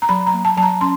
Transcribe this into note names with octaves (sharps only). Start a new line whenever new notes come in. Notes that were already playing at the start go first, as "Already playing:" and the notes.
A#5
F#3 B5
A#5
A#3
A5
F#3 A5
A#5
C#4 C6